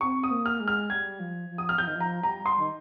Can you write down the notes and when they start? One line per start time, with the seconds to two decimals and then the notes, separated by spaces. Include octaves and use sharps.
0.01 C4 C#6
0.24 D#6
0.31 A#3
0.46 F6
0.60 G#3
0.68 F6
0.90 G3 G#6
1.20 F3
1.49 F3
1.58 D#6
1.69 F6
1.78 F3 G6
1.87 D#3
1.95 F3 A#5
2.23 G3 A#5
2.46 C6
2.59 D#3